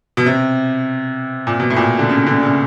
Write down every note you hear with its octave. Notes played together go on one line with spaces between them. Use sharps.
B2
C3
A#2
B2
A2
A#2
D3
C#3
D3
C#3